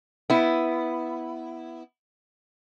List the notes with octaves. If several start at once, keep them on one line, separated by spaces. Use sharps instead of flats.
B3 E4